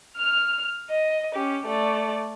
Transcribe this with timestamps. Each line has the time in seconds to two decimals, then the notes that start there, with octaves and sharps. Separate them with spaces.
0.17 F6 F7
0.90 D#5
1.35 C#4 G4
1.66 A3 D5